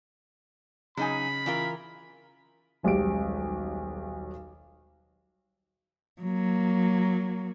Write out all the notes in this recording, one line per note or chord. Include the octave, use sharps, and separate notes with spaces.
C#3 F#3 D#4 G#5 B5
E3 F4 A#4
D#1 B1 G#3 G4 D7
F#3 A#3